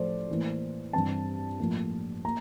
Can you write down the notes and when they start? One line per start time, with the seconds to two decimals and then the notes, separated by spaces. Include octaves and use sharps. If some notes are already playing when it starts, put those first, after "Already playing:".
Already playing: A2 F3 A3 C5 D5
0.29 A2 E3 A#3
0.93 G2 E3 G3 C4 A5
1.59 A2 F3 A#3
2.25 A#3 A#5